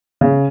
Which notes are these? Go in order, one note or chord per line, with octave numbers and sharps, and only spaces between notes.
C#3